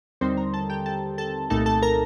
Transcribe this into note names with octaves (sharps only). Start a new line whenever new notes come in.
D#2 D3 G3 C4 D#4 C5 C6
A#4 A#5
A4 A5
G4 G5
A4 A5
A4 A5
C2 A#2 A3 D#4 A4 A5
A4 A5
A#4 A#5